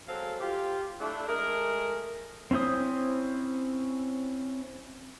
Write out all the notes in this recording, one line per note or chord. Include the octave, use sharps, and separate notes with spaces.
F#3 G#3 C4 A4 C5 F5
F4 G4
A3 D4 E4
G#3 A3 G#4 A#4
C4 C#4 E4 C5 D#6